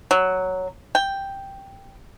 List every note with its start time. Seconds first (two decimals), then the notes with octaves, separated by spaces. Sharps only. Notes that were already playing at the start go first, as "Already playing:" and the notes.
0.11 F#3
0.95 G5